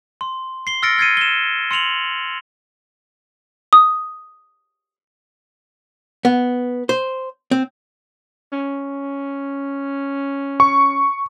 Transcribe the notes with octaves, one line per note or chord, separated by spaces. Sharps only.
C6
C7 G7
E6 F6 A6 A#6 C#7 D7
F6 G#6 A6 C7 C#7 D#7
E7 G7
C6 C#7 F7 F#7
D#6
B3
C5
C4
C#4
C#6